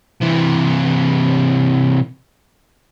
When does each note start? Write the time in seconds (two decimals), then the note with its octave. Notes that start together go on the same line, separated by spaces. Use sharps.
0.21 C3 E3